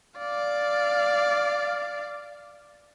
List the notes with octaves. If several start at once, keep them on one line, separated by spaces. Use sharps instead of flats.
D5 F5